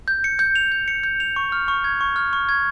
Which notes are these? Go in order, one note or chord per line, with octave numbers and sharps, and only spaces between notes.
G6
C#7
G6
F7
G6
C#7
G6
F7
C#6
F6
C#6
G#6
C#6
F6
C#6
G#6